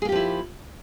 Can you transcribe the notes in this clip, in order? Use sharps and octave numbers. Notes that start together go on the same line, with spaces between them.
F3 A#3 E4 G4 G#4